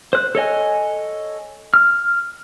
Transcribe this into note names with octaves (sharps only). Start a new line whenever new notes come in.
C5 F#6
A4 C#5 D#5 G#5
F6